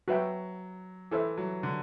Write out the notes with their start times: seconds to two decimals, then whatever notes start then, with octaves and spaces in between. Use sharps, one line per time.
0.08 F#3 F#4 B4 E5 G5
1.11 E3 E4 A4 C5 E5
1.38 F#3
1.63 D3